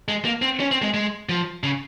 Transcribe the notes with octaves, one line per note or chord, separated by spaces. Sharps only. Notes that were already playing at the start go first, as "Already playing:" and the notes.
G#3
A#3
C4
C#4
C4
G#3
G#3
F3
C#3